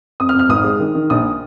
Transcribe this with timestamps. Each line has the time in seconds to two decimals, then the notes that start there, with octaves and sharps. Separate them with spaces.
0.20 F2 D#6
0.29 F6
0.34 F2
0.39 F6
0.49 G#1 D#6
0.64 G#3
0.80 D#3
0.95 D#3
1.10 A#1 D#6